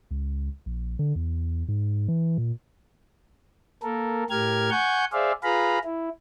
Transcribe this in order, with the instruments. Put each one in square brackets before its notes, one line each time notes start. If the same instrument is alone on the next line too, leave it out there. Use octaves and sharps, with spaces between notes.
[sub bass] C#2
A#1
D3
E2
G#2
E3
A#2
[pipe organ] A#3 A4 A#4
A2 G4 A#4 F6 G#6
F#5 G#5 C#6 G6
G#4 C5 D5 E5 F5
F4 G#4 B4 F5 A#5 B5
E4